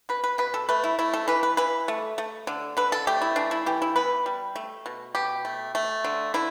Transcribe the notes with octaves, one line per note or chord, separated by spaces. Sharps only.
B2 B4
B4
B2 B4
A4
A3 B4
E4
A3 E4
A4
E3 B4
B4
E3 B4
A3
A3
D3
D3 B4
A4
A3 G4
E4
E3 D4
E4
E3 G4
E4
B3 B4
G3
A3
B2
B2 G4
A3
A3
D3
D3 E4